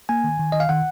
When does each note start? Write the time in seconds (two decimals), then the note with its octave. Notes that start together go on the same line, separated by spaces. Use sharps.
0.09 A#3 G#5
0.24 D#3
0.40 D#3
0.52 D#3 D#5
0.60 F5
0.69 D#3 F#5